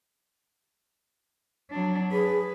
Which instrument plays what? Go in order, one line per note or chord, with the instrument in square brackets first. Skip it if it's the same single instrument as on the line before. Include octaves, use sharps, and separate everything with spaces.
[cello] F#3 D4
[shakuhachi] G#4 [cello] B4